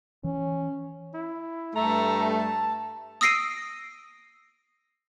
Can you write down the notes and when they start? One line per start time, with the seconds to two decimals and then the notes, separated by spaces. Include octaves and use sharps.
0.24 E3 C#4
1.14 E4
1.75 G2 A3 A#5
2.39 A5
3.21 D#6 E6 A#6 C7 D7 D#7